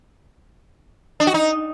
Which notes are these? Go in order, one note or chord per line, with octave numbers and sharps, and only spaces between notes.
D4
F#4
D#4